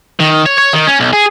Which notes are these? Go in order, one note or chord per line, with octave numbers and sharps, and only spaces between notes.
D#3
C#5
C#5
D#3
C#4
B1
G#4